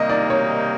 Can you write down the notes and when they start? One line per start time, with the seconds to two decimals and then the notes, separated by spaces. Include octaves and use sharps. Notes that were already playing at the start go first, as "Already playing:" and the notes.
Already playing: C3 D#3 G3 A#3 D#4 D#5
0.10 D5
0.30 C#5